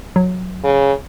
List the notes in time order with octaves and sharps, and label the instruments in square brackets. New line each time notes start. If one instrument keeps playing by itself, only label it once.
[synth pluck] F#3
[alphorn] C#3